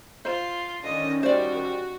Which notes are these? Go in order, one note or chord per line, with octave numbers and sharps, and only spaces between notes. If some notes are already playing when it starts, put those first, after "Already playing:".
F4 C5
D3 D#3 C#4 D#5
G3 F#4 C5 D5